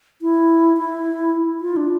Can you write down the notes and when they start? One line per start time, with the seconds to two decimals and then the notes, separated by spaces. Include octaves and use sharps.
0.22 E4
0.77 E4
1.61 F4
1.76 D4